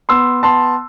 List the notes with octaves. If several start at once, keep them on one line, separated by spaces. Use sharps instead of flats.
B3 C6 E6
B3 A5 C6